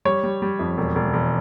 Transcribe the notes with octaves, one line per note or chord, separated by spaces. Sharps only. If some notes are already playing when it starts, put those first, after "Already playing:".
G3 C#5
G3
G3
F2
E1
E1
E1